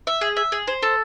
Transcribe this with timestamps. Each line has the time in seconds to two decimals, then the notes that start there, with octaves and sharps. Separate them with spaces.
0.07 E5
0.21 G#4
0.37 E5
0.52 G#4
0.67 C5
0.82 A4